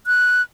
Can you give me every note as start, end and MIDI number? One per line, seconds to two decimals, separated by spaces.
0.07 0.42 90